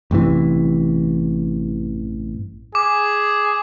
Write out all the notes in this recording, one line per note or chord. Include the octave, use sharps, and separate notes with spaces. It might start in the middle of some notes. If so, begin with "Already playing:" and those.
A1 G2 C3 E3
G#4 D6